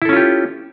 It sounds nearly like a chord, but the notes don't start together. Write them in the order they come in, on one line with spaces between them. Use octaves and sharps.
E4 A4 C#4 F4 G4